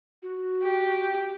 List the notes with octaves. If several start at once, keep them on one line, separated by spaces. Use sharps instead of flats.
F#4
G4